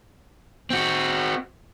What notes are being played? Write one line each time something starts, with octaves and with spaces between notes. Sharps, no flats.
C4 F#4